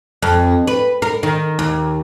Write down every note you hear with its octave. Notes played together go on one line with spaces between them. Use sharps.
F2
B4
A#4
D#3
D#2